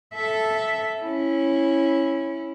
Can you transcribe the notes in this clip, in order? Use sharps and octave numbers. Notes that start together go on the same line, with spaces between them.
A4 E5
C#4 E4